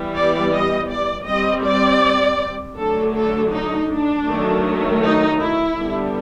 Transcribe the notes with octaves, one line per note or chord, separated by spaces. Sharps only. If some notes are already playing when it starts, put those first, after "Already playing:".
Already playing: E3 G3 B3
D5
D#5
D5
G3 C4 D#5
D5
D3 F#3 A3 D4 A4
A4
D#4
D4
D#3 F#3 A3
D#4
E4
D3 G3 B3 D4